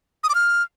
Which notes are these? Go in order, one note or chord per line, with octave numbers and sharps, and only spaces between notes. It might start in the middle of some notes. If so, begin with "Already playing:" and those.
D#6
D6
F6